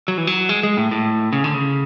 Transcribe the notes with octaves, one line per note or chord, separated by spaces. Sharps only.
F#3
E3
F#3
G#3
G#3
A2
A2
C#3
D3
C#3